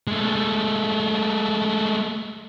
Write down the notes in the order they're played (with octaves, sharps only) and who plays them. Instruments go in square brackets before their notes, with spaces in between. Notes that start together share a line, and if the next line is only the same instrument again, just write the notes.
[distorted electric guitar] G#3 A3